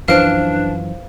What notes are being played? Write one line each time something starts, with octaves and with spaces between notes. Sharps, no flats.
F#2 E3 F3 D4 B4 C5 F5 D7